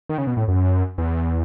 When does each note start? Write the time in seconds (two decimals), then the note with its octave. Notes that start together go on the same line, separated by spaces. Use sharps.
0.09 D#3
0.18 C#3
0.27 B2
0.37 A2
0.48 F#2
0.98 E2